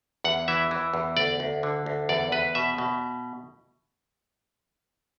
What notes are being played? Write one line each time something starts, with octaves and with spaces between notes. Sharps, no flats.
E2 F#5
E3 E5
E3
E2
D2 D5
D2
D3
D2
E2 D5
E2 B4
B2 E5
B2